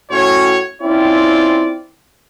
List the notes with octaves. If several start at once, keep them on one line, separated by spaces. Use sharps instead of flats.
A2 C#4 F#4 C#5
C4 C#4 E4 F4 D5